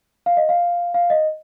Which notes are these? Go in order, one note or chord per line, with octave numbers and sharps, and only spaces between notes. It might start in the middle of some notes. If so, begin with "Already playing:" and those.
F5
D#5
F5
F5
D#5